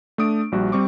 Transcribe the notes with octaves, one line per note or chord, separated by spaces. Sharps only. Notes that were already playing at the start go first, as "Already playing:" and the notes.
A3 D4 D#6 D7
A#1 G3 F#4
G3 C4 C#6 D6